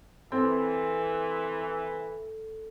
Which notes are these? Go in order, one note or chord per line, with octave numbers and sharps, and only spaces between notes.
E3 C4 A4